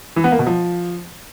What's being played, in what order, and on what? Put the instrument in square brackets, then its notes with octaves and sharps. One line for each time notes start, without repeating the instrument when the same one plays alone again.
[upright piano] E3
B3
A#3
B2
F3